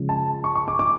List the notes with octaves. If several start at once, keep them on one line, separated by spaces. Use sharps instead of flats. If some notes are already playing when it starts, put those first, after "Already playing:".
Already playing: C#3 F3 G#3
A5
C#6
C#6
D6
D6